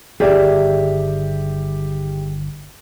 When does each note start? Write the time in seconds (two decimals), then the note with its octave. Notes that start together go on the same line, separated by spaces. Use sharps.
0.20 G1 G2 D#3 G4 G#4 D5 E5